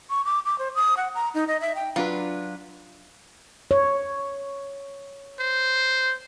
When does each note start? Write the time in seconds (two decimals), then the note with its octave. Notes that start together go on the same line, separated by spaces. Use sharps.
0.10 C#6
0.25 D6
0.45 D6
0.59 C5
0.75 D#6
0.97 F#5
1.15 A#5
1.34 D#4
1.48 D#5
1.61 E5
1.75 G5
1.96 F#3 D4 F4 B4
3.71 C#5
5.40 C5